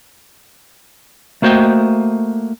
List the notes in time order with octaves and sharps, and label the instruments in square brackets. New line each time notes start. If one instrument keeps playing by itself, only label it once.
[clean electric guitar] A3 A#3 F#4 C5 D#5 G5